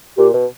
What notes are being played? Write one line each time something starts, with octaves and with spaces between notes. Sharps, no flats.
A#2 G4
B2